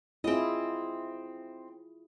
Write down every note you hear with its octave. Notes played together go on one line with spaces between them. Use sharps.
C4 E4 F4 G#4 D#5